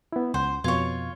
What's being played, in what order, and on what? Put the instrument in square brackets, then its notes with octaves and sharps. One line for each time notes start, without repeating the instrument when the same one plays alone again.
[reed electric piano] B3 E4
[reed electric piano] C#2 F#5 [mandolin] C5
[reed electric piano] F2 B2 G#6 [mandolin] F4 C#5